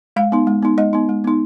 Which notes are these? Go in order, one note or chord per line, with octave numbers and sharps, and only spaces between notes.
G#3 F5
B3 D#4
G#3
B3 D#4
G#3 D#5
B3 D#4
G#3
B3 D#4